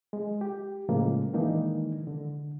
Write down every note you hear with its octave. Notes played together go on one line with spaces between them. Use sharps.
G#3
G4
A2 C#3 F3 G#3 A#3
D#3 E3 G#3 A#3 D4 D#4
D3